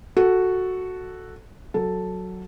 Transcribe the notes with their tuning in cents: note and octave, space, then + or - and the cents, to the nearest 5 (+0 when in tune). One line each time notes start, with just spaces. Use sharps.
F#4 +0 A4 +0
F#3 +0 A4 +0 A5 +0